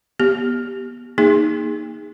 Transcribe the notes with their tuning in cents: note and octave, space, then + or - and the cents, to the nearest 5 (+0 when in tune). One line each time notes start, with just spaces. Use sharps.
B3 -30 G4 +0
A#3 +15 D#4 +0 G#4 -20